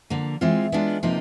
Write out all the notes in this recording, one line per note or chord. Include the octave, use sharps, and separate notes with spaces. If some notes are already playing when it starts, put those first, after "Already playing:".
D3 F3 A#3
E3 G#3 C4 F4
G#3 B3 D4 F4
C3 F3 A#3 D#4 G4